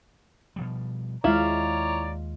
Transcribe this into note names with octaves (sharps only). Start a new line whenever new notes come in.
B2 F3 G3
D#2 G#3 E4 F4 C#5 D5 F5 A#5